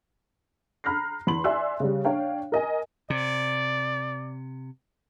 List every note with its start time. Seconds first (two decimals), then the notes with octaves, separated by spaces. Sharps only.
0.84 A#5 B5 F6 F#6 A#6 C7
1.27 E2 B5 C6 F#7
1.44 D5 E5 G#5 C6 E6 F#6
1.80 C#3 G3
2.05 D4 C#5 F5 G5
2.52 A#4 D#5 G#5
3.10 C3 D5